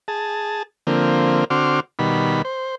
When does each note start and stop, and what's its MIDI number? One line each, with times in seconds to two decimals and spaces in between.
0.08 0.63 68
0.08 0.63 81
0.87 1.44 50
0.87 1.44 53
0.87 1.44 58
0.87 1.44 60
1.50 1.80 50
1.50 1.80 60
1.50 1.80 66
1.50 1.80 84
1.50 1.80 86
1.50 1.80 89
1.99 2.42 47
1.99 2.42 51
1.99 2.42 55
1.99 2.42 83
2.45 2.75 72